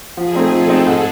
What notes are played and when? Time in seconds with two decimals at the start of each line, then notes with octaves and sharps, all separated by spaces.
0.17 F3 G#4
0.35 A3 C4 D#4
0.52 F3 A4
0.69 A3 C4 D#4
0.87 G#2